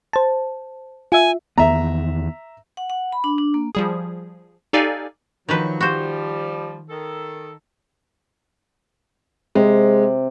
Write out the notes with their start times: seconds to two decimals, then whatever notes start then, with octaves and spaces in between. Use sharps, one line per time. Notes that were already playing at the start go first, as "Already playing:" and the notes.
0.13 C5 A5
1.12 F4 E5 G#5
1.58 E2 D#3 B3 E5 A#5
2.77 F#5
2.90 F#5
3.12 B5
3.24 D4
3.38 D4
3.54 A#3
3.75 F3 G3 G#4
4.73 D#4 G4 A4 D5 F5 G#5
5.49 D#3 F3 F#3 B4
5.81 F3 G3 F#4 C5
6.90 D#3 A4
9.55 C3 G#3